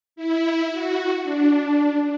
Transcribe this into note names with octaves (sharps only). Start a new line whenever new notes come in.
E4
F#4
D4